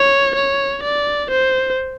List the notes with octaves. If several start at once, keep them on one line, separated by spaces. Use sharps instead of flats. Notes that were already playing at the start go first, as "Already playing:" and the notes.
Already playing: C#5
C#5
D5
C5